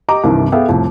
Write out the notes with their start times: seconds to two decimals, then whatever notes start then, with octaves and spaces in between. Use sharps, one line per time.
0.08 G4 D#5 A#5 D6
0.24 C2 G2 C3 D#3 E3
0.52 B3 G#4 A4 E5 F5 G5
0.69 C2 F2 A2